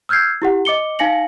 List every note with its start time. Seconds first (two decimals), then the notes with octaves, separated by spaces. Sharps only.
0.09 E6 F6 G6 G#6 C7
0.42 E4 G4 F#5
0.65 D#5 D6 C#7 G7
0.99 D#4 F5 G#5 A#6 C#7 F#7